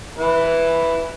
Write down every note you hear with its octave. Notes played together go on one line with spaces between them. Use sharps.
E4 B4